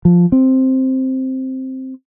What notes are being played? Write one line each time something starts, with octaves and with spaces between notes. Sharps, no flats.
F3
C4